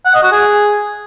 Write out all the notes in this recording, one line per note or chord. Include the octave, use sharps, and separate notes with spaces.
F#5
D#5
F#4
G#4